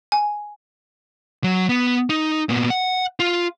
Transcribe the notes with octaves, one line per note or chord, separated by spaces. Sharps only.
G#5
F#3
B3
D#4
A#2 B3
F#5
F4